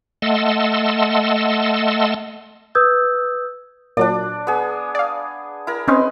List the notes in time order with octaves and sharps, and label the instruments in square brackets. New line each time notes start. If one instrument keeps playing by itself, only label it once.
[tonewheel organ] A3 D#5 F#5 A5 C6 E6
[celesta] B4 D#6 E6 G6 G#6
[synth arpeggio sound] A#2 F#3 [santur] D4 D5
[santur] B3 G#4
[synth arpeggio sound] D5 F5
[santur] E4 A#4
[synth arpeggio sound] C4 C#4 [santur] D#4 B4 C6